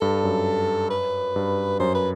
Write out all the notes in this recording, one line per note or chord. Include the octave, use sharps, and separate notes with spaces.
G2 A4
F#2
B4
G2
F#2 C5
B4